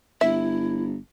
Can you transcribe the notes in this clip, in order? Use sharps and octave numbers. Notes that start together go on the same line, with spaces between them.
G1 E4 E5